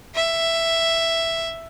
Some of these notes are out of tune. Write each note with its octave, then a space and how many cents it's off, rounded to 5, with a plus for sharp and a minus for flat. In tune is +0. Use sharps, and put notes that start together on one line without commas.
E5 +5